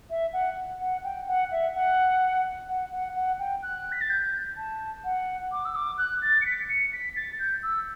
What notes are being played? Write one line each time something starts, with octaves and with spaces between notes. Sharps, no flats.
E5
F#5
F#5
G5
F#5
E5
F#5
F#5
F#5
F#5
G5
F#6
B6
A6
G6
A5
F#5
D6
E6
D6
F#6
A6
C#7
B6
C#7
B6
A6
G6
E6